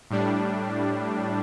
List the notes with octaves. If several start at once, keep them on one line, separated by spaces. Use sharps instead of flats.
A2 G3 D4